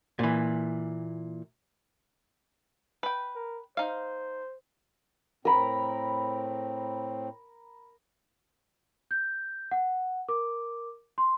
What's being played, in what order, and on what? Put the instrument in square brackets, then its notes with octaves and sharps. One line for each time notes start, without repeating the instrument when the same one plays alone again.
[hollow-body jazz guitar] A#2 E3
[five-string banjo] B4 G5
[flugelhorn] A#4
[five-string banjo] D#4 F5 [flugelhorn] C5
[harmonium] A2 C4 [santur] A#4 B5
[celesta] G6
F#5
A#4 D6
C6